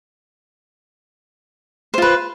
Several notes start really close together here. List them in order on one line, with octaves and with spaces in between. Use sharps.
C5 F4 B4